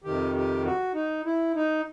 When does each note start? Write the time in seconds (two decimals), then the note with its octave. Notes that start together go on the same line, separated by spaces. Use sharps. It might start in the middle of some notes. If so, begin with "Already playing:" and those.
0.04 F2 C3 D#3 G4
0.35 G4
0.65 F#4
0.94 D#4
1.25 E4
1.55 D#4